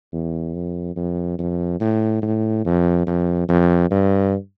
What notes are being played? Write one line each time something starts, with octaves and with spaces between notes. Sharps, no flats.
E2
F2
F2
F2
A2
A2
F2
F2
F2
G2